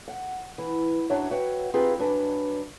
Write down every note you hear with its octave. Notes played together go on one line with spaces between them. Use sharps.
F#5
E3
F#2 F#3 D4 C#5 E5
F#4 B4 C#5 E5 F#5 G5
C4 D#4 F4 G4 G#4 B4
G2 F#3 D4 B4 G#5